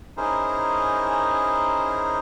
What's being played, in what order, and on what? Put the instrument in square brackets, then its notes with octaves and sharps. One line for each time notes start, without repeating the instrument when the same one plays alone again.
[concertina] C#4 D#4 E4 G#4 A#4 C5